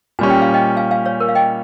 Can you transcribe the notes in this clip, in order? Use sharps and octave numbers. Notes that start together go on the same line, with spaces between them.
A#2 G3 C#4 G#5
G5
F5
D#5 G5
F5 G#5
F5 G#5
C#5 F5
A#4
F5
D#5 G5